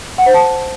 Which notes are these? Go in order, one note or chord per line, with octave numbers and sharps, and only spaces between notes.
F#5
C5
A5